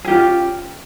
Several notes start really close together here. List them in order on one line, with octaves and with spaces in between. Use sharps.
G#4 G4 F4 C#4